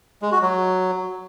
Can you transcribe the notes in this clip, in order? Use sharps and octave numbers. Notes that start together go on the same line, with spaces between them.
G#3
F#4
F#3